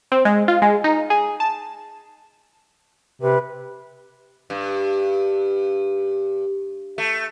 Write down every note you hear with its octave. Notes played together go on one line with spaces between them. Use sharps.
C4
G#3
F4
G#3
D#4
G#4
A5
C3 B4
G2
A3